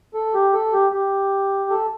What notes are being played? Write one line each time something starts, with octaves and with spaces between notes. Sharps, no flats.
A4
G4
A4
G4
G4
A4